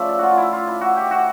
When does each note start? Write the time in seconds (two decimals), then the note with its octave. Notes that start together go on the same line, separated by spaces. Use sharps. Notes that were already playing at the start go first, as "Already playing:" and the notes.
Already playing: C#3 F3 A3 D5 E5
0.09 A4
0.19 F4 F#4
0.38 E4
0.53 F4
0.67 E4
0.81 F#4
0.97 G4
1.11 F#4